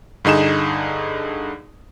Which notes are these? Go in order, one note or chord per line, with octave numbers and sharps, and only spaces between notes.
G2 D3 D#4 G#4 E7